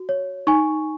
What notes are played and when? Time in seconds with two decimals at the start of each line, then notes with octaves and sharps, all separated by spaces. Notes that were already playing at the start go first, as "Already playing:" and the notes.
Already playing: F#4
0.09 C#5
0.47 D#4 G#5 C#6